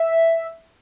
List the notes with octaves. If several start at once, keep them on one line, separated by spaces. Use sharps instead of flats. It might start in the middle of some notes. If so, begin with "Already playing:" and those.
Already playing: E5